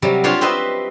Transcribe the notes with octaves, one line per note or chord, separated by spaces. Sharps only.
C3 F#3 G3
D4 F4 G4 C5 C#5
C4 G4 B4 C5 D#5 E5